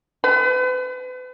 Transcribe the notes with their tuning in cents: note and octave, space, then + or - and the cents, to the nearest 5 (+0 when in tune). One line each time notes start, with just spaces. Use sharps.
B4 +40